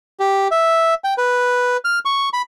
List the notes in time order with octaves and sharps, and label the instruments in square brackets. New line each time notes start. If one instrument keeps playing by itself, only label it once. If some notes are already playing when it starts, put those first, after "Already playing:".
[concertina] G4
E5
G5
B4
F6
C#6
B5